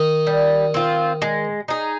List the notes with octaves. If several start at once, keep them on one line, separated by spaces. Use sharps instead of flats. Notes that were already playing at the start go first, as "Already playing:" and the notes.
Already playing: D#3 D#4
G3
C4 F4
G#3
D#4 G#4